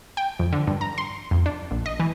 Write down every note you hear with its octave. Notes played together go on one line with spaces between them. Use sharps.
G5
F2
D3
G2
A#5
C6
F2
D4
A#1
D#5
E3